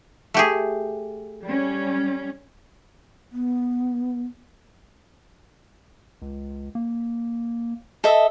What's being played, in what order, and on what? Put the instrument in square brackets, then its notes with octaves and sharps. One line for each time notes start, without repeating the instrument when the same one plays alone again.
[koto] A3 G4 G#4
[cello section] G3 C#4
[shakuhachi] B3
[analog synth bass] C#2
A#3
[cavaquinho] A4 D#5 E5